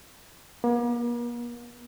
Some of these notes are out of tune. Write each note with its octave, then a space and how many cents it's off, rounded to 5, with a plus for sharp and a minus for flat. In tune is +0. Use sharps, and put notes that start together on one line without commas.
A#3 +45